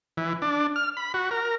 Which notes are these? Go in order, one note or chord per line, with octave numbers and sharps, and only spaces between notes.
E3
D4
F6
B5
F#4
A#4